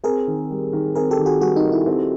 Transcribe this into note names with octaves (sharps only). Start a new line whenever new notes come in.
C4 G#4 A#4
D#3
G3
D#3
C4 G#4 A#4
G4 A4
D#3
F#4 G#4
G3 F#4 G#4
D#4
D#3
E4
C4